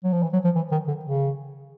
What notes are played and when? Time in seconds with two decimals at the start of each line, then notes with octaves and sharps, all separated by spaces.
0.04 F#3
0.13 F3
0.23 E3
0.33 F#3
0.44 F3
0.56 E3
0.72 D#3
0.88 D3
1.05 C#3